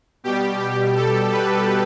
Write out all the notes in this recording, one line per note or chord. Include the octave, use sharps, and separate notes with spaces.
B2 G3 G4
G4
A4
B4